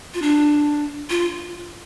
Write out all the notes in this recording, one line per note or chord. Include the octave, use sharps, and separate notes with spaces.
F4
D4
F4